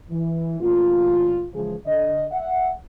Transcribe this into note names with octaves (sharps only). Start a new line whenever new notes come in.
E3
A1 A#2 F4
C#2 E3 F3 G#4
D3 D#5
E5 F#5